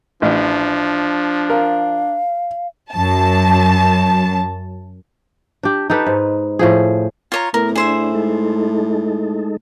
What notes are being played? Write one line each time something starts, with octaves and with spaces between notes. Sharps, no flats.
A1 F3 D4
A#4 F5
F#2 A5
D4 G4
D#4 G4 A4 B4
G#2
A2 F3 G#4
F4 C#5 A#5
A2 B3 A#4
D4 G#4 C5 E5
G#3 D#4 A4